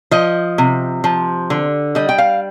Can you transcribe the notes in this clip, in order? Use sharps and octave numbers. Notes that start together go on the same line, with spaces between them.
F3 D#5
C3
F3
D3
G3 D#5
G5
F5